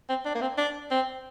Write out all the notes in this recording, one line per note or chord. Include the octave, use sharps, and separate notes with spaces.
C4
D4
A#3
C4
D4
C4